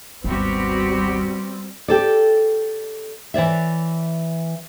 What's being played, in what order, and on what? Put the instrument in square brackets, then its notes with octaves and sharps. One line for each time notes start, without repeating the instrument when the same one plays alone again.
[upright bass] G#1 D#2 [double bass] G3 C4 [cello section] B3 F#4 G4
[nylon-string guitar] G4 A4 D5
E3 C#5 D5 E5